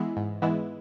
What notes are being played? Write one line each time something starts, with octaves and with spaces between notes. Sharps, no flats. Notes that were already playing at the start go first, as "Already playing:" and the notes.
Already playing: E3 G#3 B3 E4
G#2
E3 G#3 B3 E4